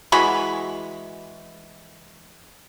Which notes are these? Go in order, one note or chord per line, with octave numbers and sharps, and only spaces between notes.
E3 G#3 F#4 B5